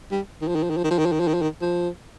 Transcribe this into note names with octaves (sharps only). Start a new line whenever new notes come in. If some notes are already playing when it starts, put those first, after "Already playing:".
G3
D#3
F3
D#3
F3
D#3
F3
D#3
F3
D#3
F3
D#3
F3
D#3
F3
D#3
F3